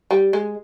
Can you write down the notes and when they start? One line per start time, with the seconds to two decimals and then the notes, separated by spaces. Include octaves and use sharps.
0.11 G3
0.33 G#3